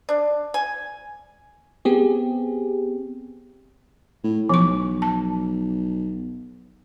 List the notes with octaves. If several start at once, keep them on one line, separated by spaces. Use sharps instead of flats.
D4
G#5
B3 C4 G4 G#4
A2
B1 F3 C#6
A5